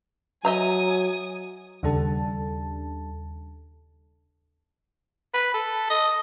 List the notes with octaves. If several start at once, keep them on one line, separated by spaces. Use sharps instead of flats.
F#3 D#5 E5 G#5 A#5 D#6
D#2 C#3 G3 D4 A4 A5
B4
A4
D#5